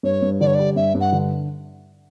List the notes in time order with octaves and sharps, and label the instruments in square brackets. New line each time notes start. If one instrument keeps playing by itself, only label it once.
[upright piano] G2 [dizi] C#5
[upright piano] G2
[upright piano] D3 [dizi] D5
[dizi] C#5
[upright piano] G3 [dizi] D5
[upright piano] G2 [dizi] E5
[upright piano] G2
[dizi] F#5
[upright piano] D3